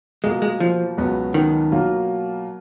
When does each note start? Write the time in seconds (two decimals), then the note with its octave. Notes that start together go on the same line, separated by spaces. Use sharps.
0.24 B2 G#3 A#3 F4
0.42 G#3
0.60 F3
0.98 C#2 B2 F#3 B3
1.34 D#3
1.71 B2 F#3 A#3 F4